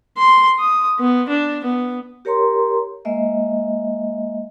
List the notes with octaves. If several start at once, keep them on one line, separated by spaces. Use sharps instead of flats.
C6
D#6
B3
D4
B3
G4 A#4 C#5 A#5 C6
G#3 A#3 D#5 E5